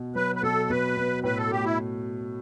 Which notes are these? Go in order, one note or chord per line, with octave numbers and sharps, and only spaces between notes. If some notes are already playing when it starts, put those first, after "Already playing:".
Already playing: B2
F#3 B4
B4
B2 A4
B2 B4
B2
A2 B4
A4
A3 G4
E4